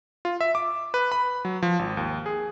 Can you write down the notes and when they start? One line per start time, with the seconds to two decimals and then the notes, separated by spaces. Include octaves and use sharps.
0.25 F4
0.41 E5
0.55 D6
0.94 B4
1.12 B5
1.45 F#3
1.63 F3
1.79 G#1
1.97 D#2
2.26 G#4